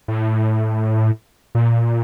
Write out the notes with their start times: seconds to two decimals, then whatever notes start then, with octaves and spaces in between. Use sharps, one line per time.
0.08 A2
1.55 A#2